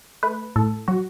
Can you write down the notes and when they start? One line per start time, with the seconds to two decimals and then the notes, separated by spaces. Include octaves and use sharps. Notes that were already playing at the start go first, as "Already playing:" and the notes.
0.23 A3 B4
0.56 A2 A4
0.88 F#3 F#4